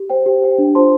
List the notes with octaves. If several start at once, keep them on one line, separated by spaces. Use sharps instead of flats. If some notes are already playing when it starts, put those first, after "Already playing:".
Already playing: G4
C5 G5
G4
C5 G5
D4
F4 C5 A5 C6